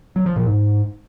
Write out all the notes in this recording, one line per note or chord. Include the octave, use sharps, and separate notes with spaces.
F#3
F3
A#2
G#2